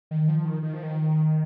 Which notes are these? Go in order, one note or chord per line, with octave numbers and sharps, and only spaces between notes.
D#3
F3
D#3
D#3
F3
D#3